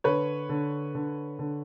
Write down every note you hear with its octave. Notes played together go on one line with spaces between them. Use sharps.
D3 B4 C#5
D3
D3
D3